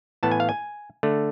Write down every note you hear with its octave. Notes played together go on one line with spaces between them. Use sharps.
A2 E3 B3 A5
G#5
F5
G#5
D3 A3